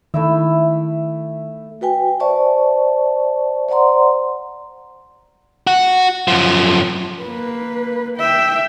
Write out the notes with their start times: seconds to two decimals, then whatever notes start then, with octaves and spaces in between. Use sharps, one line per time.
0.14 D#3 A3 E4 E5
1.81 F#4 B4 G5 G#5
2.20 C5 D5 E5 A5 C#6
3.69 C5 D5 F#5 A#5 C6
5.67 F#4
6.28 F#2 F3
7.22 A#3 B4
8.18 E5 G5